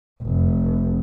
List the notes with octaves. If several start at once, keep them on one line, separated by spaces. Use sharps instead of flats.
F1